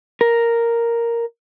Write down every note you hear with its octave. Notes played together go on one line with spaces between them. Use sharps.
A#4